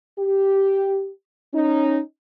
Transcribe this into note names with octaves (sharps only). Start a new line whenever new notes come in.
G4
C#4 D#4